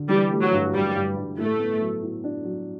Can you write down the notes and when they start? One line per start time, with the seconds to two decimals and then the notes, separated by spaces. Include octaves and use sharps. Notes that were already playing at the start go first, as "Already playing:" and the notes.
Already playing: D3
0.09 E3 G3
0.31 A3
0.42 F#3
0.52 G2
0.74 G2 G3
0.96 G2
1.17 G2
1.38 A2 A3
1.59 B3
1.81 F#3
2.03 A2
2.24 D4
2.44 F#3